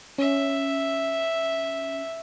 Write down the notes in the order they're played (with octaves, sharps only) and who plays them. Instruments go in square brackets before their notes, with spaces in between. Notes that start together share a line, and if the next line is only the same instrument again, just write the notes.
[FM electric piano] C#4 [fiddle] E5